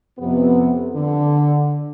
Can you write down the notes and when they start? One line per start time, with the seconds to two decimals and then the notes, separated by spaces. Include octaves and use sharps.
0.19 F2 C3 B3
0.95 D3